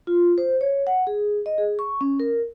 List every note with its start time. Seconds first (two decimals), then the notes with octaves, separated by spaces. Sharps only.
0.07 F4
0.38 C5
0.61 C#5
0.87 F#5
1.07 G#4
1.46 D#5
1.58 G#4
1.79 C#6
2.01 C#4
2.20 A#4